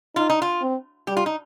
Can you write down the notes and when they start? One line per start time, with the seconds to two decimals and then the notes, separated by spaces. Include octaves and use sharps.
0.15 D#4 F4
0.29 D#4
0.42 F4
0.62 C4
1.07 G3 G4
1.17 F4
1.26 D#4